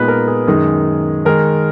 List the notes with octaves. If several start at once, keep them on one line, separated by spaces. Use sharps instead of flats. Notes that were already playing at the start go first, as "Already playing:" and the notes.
Already playing: A#2 G#3 B3 D#4 B4
A#4
G#4
F#2 D#3 G#3 D#4 G#4
D#3 G#3 D#4 A#4